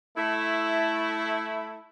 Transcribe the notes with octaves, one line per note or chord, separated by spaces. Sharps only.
A3 E4